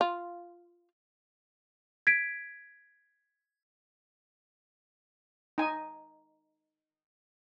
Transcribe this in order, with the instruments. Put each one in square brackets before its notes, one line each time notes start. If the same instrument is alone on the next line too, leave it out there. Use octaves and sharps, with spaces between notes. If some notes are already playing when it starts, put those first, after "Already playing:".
[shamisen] F4
[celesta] G#6 B6 D7
[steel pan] D#4 G#5